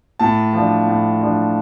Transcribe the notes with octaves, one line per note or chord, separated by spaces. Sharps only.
A2 A5
F3 D4
A2
F3 D4